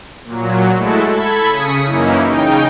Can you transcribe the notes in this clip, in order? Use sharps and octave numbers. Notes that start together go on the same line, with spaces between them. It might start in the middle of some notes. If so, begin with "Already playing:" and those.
A#2 F#3
G#3 A3 E4 F#4 A4
A4 B5 G#6
C#3 D#6 B6 C#7
F#2 E3 A#3 C#4 D#4 E4
C#3 D#4 G5